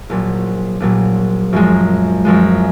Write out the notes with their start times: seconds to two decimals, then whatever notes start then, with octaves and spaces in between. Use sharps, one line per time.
0.10 A#1 A#2 F#3
0.80 A#1 A#2 F#3
1.53 F#2 F3 G#3
2.25 F#2 F3 G#3